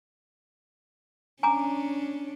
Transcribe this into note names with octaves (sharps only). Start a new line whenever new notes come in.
C#4 D4 G#5 A#5 D6